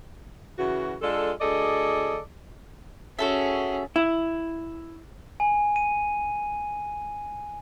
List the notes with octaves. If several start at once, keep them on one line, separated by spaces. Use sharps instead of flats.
C#3 E3 F#4
G#3 D4 F4 A4
D2 G#4 A4 D5 D#5
C#4 F#4 G#4 A4 E5
E4
G#5
D#7